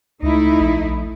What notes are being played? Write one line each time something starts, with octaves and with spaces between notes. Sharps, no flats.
C#2 A3 D#4 E4
A#1